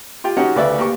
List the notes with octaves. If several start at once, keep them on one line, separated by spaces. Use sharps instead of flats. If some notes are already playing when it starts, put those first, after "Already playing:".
F4 G4 G5
C#4 D#4 F#4 G4 F#5
D2 C#3 B4 D5 E5
A#3 G4 C#6